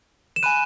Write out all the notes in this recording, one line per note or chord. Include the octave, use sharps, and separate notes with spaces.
E7
G#5 B5 F#6 D#7